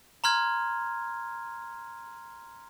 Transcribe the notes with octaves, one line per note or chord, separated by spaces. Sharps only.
A#5 C6 F6 G#6